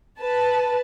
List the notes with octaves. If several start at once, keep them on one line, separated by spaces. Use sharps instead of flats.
B4 A5